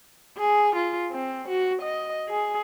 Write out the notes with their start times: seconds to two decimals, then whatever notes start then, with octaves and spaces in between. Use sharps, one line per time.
0.38 G#4
0.76 F4
1.11 C4
1.49 F#4
1.82 D#5
2.29 G#4